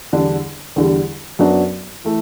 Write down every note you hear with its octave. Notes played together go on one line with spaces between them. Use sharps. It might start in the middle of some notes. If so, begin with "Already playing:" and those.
E2 D3 G3 D4
E2 D3 G3
F#2 F#3 B3 D4
E3 A3